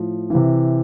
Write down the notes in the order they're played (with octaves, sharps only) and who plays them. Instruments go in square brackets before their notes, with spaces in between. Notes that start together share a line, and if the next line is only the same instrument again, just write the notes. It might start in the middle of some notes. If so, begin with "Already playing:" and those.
Already playing: [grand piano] A2 F3
C3 E3